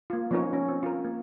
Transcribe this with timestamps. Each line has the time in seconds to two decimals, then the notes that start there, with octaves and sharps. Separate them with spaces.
0.10 A#3 F4
0.31 F3 B3 C#4 D#4 A#4 C#5
0.53 C#4
0.68 C4
0.83 F4 A#4
1.05 A#3